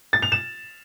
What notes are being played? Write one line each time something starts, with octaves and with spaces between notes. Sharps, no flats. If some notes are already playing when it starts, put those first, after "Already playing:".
A6
F7
E7